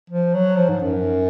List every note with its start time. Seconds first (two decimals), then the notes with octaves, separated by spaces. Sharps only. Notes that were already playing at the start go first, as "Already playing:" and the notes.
0.10 F3
0.34 F#3
0.57 F3
0.69 G#2
0.81 F#2